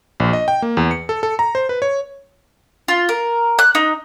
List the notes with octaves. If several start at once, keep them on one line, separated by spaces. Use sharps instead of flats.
A#1
D#5
G5
A#3
E2
C#7
A4
A4
A#5
C5
B4
C#5
F4
A#4
F#6
D#4